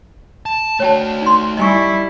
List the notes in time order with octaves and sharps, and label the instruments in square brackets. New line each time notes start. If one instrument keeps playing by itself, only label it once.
[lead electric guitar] A5
[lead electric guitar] A3 F#4 [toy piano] C#5 G5 A5
[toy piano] D#4 C6
[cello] G3 E4 [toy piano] D#5 G#5 C#6